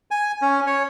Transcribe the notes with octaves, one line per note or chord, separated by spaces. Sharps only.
G#5
C#4
C#5